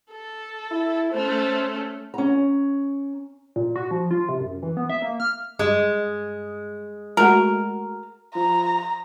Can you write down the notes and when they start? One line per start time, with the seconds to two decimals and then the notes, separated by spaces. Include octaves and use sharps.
0.11 A4
0.71 E4
1.12 A3 C#4 C5
2.14 C#4 A#5
3.56 A#2
3.76 F#4
3.91 F3
4.11 F4
4.29 C3
4.40 F#2
4.63 E3
4.77 B3
4.90 E5
5.02 A#3
5.20 F6
5.59 G2 G#3
7.17 G#3 A3 F#4 A#4
8.35 F3 A#5